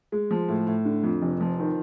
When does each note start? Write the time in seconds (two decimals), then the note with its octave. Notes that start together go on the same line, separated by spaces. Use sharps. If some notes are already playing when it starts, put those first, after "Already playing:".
0.12 G#3
0.31 F3
0.49 A2
0.67 A2
0.85 D3
1.04 F2
1.22 F1
1.41 F3
1.60 D#3